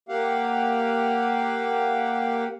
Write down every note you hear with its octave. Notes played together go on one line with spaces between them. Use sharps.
A#3 G4 F5 F#5